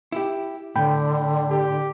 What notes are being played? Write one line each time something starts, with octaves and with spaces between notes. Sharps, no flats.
E4 G4
A2 D3 G5 B5
G4